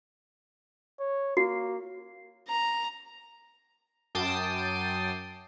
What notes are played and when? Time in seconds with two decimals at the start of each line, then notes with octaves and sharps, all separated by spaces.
1.00 C#5
1.37 A#3 F#4
2.48 A#5
4.15 F#2 G5 A5 D6 D#6 C7